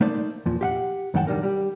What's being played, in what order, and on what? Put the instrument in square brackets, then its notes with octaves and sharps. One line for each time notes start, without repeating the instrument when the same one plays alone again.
[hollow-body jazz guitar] A3 A#3 D#4 C5 D5
E2 A#2 F3
G4 F5 F#5
F#2 A2 D#3 F#5 G5 A5
B1 D#3 G3 G#3 D4 A#4
G3 G4